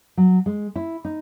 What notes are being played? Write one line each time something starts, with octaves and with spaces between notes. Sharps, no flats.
F#3
G#3
E4
D#4